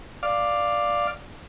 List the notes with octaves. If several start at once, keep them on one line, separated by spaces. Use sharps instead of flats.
D5 F5